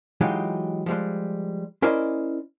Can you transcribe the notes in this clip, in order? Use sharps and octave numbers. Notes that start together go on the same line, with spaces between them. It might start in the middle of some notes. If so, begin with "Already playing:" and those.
E3 F#3 G#3 D#4 F4 G4
F3 G3 G#3
C#4 E4 A#4 C5 D5 D#5